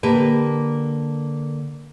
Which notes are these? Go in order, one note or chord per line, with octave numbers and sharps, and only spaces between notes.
D3 A#3 G4 A#4 B4